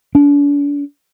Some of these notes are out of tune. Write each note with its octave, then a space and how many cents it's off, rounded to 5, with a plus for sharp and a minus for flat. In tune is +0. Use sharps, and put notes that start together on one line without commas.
D4 -40